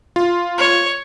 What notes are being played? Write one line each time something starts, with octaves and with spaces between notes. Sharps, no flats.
F4
C#5